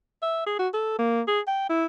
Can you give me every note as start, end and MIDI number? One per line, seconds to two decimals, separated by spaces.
0.22 0.42 76
0.46 0.57 68
0.59 0.68 66
0.73 0.96 69
0.99 1.22 58
1.27 1.40 68
1.47 1.68 79
1.69 1.86 64